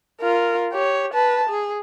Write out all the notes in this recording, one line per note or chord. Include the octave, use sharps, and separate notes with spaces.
F4 A#4
G4 C#5
B4 A5
G#4